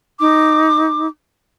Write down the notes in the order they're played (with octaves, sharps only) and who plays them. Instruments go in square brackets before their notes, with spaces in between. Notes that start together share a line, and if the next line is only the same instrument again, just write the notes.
[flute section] D#4 D6